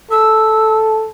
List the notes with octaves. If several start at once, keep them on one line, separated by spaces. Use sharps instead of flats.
A4 E6